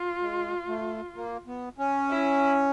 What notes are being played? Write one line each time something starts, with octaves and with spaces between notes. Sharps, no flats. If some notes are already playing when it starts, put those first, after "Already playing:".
Already playing: F4
G#3
A3
A#3
B3
C#4
E4